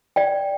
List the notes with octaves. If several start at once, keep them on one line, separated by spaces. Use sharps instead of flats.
D5 G5